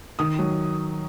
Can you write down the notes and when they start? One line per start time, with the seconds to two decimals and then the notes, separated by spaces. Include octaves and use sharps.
0.19 D#3 D#6
0.39 F#3